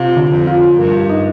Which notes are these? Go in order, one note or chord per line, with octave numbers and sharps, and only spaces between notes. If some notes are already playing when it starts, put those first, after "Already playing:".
Already playing: C3 F4
D3
F2
F4
G2 A#4
D#4